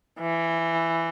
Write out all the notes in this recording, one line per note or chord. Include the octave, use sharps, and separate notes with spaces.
E3